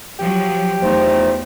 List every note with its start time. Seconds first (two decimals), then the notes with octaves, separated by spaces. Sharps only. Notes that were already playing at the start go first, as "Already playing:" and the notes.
0.19 F3 F#3 G4
0.83 E2 F3 A3 D#4 C5